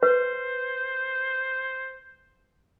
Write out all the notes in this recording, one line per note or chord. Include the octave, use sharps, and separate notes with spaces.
B4 C5